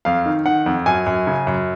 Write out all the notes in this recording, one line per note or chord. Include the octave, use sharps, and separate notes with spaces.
F2 F5
D#3
D#3 F#5
F2
F#2 G#5
F#2
C#3
F#2